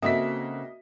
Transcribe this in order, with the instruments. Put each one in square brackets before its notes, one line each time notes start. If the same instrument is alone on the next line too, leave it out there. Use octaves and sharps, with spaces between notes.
[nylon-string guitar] C#3 C4 A4 [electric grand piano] A#3 F#4 B6 [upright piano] D#5 [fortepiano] E5